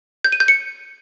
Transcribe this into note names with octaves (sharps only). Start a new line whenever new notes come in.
G6
D#7
G6
C#7